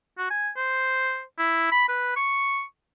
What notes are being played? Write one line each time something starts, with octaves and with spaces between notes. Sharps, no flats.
F#4
G#5
C5
E4
B5
B4
C#6